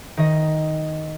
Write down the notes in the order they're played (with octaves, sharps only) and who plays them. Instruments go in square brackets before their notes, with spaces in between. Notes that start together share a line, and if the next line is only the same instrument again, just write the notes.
[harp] D#3 D#5